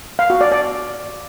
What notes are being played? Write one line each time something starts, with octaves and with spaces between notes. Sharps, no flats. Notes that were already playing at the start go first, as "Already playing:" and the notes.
F5
F#4
D5
D5